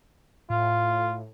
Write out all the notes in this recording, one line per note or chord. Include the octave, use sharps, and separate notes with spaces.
A2 F4